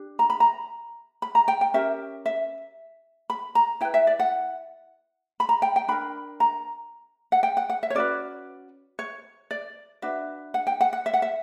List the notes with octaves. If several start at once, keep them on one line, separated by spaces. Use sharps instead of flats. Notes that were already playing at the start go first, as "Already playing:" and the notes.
Already playing: D4 G4
A#5
B5
A#5
B5
A#5
G5
G5
C#4 G4 A#4 E5
E5
B5
A#5
E4 B4 G5
E5
D5
F#5
B5
A#5
G5
G5
D4 A#4 B5
A#5
F#5
G5
F#5
F#5
E5
C#5
C#4 F#4 B4 D5
C#5
D5
D4 F#4 B4 E5
F#5
G5
F#5
F#5
E5
F#5
E5